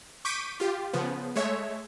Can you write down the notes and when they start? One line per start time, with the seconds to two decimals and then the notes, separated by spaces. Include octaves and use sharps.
0.25 C#6 D6 G6 B6 D7 D#7
0.60 F4 G4
0.93 C#3 F3 B3
1.36 G#3 A3 C#5 E5